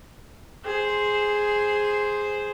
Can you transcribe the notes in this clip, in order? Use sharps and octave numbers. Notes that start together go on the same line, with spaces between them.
G#4 C5